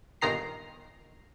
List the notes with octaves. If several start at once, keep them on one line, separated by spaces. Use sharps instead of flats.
G1 A#2 D#3 A#5 C7